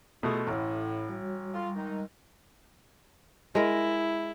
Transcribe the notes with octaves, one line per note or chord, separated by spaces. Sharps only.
B2 A3 E4 F4 G#4
A1 A2
G3 F#4 C#5
G3 F4 A4
D#3 G#3 D#4
G#3 E4 A#4